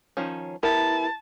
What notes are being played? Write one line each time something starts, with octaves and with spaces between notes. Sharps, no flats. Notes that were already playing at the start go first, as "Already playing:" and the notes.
D#3 F3 C#4
B3 E4 G4 A#4 A5